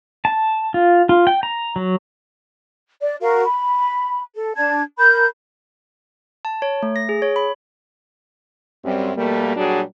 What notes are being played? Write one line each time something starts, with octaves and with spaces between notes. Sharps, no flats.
A5
F4
F4
G5
A#5
F#3
D5
F#4 A#4 F5
B5
A4
D4 A5 G#6
A#4 B5 G6
A5
C#5
A3
A#6
G#4
C#5
B5
F#2 G3 C4
B2 G3 A3 A#3
A#2 F#3 G3 D4 F#4 G#4